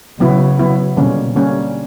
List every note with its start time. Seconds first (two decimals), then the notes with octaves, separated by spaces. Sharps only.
0.20 C#3 F#3 B3 E4
0.59 F#3 B3 E4
0.97 B2 D3 G3 A#3 C#4
1.36 D3 G3 A#3 C#4